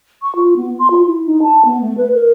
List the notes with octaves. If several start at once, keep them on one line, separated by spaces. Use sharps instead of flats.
C#6
F4
B3
C6
F4
E4
D#4
A5
B3
A3
B4
A#4